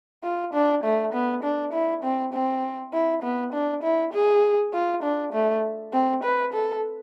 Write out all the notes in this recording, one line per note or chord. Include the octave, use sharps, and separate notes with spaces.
F4
D4
A3
B3
D4
E4
C4
C4
E4
B3
D4
E4
G#4
F4
D4
A3
C4
B4
A4